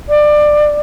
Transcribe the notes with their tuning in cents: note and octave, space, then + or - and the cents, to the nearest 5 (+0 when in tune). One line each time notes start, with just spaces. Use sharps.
D5 +25